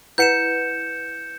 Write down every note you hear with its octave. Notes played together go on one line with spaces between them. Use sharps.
E4 B4 F#5 G6 C#7 E7